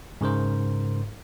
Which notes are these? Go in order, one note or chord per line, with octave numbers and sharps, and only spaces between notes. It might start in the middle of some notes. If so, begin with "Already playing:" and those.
G#2 C#3 A#4 C5